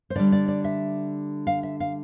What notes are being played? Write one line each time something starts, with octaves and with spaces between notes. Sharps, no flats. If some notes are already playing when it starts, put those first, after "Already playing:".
C5
D3 G3 D5
D5
D5
E5
F5
E5
F5